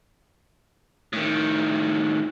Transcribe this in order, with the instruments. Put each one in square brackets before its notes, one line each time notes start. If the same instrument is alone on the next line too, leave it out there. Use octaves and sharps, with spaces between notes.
[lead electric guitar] A2 D#3